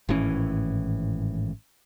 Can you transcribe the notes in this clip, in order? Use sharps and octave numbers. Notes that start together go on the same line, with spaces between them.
G#1 A2 E3 C#4